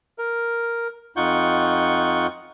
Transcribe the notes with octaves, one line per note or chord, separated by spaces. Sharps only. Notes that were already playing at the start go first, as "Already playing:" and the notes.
A#4
F2 D#4 F4 F#5 C#6 G6